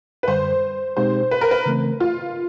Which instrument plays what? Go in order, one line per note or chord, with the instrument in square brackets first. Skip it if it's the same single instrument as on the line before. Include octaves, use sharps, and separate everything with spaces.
[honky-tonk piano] B4
[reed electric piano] F#2 D3 G3 [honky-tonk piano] C5
[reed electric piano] B2 G#3 C4 D#4 G4 [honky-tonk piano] C5
[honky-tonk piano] B4
A#4
B4
[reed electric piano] C#3 E3 A3 C4
[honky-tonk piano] F4